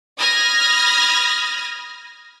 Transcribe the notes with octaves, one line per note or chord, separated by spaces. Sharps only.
B5 D#6 F6 G#6 A#6